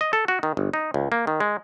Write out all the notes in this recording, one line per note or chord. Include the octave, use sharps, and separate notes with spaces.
D#5
A4
F#4
D#3
G1
D#4
C#2
A#3
D#3
G#3